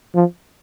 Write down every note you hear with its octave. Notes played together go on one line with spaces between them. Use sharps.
F3